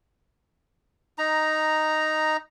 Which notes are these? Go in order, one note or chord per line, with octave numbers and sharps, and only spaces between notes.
D#4 A#5